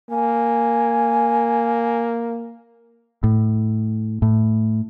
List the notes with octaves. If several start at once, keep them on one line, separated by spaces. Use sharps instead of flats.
A#3 G#5
A2
A2